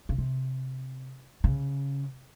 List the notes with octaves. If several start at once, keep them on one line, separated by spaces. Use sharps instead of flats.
C#3
C3
C#3